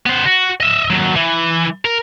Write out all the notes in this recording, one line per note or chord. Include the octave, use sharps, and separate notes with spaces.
B3 C5
F#4
D#5 E5
D#2 F#3
E3
A#4